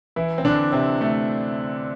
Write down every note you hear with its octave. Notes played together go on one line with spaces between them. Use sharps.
E3 E4
C4
D3 D4
C3 C4
A3